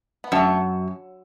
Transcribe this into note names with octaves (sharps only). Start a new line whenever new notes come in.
B3
F#2 A3